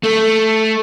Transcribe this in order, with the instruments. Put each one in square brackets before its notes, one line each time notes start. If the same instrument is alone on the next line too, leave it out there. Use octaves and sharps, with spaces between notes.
[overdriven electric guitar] A3